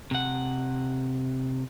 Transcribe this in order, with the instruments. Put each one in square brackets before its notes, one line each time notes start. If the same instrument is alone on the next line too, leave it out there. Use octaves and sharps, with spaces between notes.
[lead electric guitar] C3 F#5